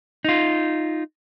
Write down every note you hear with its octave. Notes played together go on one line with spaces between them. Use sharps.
D#4 F4